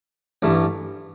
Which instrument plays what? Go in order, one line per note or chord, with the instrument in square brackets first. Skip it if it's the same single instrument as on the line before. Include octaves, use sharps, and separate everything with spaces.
[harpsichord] A1 G2 E3 A3